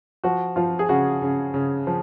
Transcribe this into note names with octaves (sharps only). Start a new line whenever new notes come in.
F3 F#4
F3 F4
G#4
C#3 F#4
C#3
C#3
F3